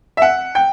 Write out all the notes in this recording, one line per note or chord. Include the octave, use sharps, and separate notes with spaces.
E5
F#5
G5